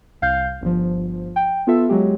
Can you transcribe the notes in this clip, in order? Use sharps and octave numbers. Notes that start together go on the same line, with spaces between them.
C2 F5 G6
G1 F3
G5
B3 F4 A4 E5
F#3 G#3 G4